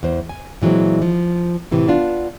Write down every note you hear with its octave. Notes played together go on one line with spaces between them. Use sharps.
E2 C5
G#5
A#2 E3 F#3 G#3 C4
F3
A2 C3 E3
B3 D4 F4